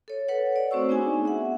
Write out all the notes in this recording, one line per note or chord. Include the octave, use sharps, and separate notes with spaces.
A4 C#5
A4 B4 C#5 F#5
D5
A3 C4 F#4 C5 C#6 E6
B3 D4 D#4 F#4 G#4 G#5
B3 E5 F#5